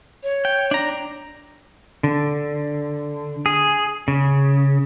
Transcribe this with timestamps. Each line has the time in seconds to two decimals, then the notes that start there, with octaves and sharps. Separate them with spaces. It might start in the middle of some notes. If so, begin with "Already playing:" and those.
0.23 C#5
0.45 G5
0.71 D4 A#5
2.03 D3
3.46 G#4
4.08 C#3